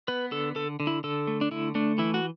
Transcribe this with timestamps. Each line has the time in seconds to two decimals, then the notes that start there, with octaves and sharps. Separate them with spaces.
0.08 B3 B4
0.31 D3 A4
0.55 D3 A4
0.80 D3
0.87 E4
1.04 D3 A4
1.27 A3
1.41 D4
1.51 D3 E4
1.75 A3 D4
1.98 E3 E4
2.14 F#4